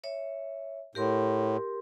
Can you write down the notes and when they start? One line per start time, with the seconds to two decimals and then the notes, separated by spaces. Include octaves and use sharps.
0.04 C#5 E5
0.95 A2 G4 A#4 C6